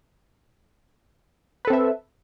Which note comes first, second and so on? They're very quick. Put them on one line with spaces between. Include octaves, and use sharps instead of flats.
B4 A4 C4 E5